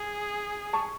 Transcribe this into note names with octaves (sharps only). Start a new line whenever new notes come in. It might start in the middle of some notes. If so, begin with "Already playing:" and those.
Already playing: G#4
A5 C#6